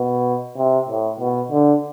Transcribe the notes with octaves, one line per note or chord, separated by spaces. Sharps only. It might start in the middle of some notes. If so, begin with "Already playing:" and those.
Already playing: B2
C3
A2
B2
D3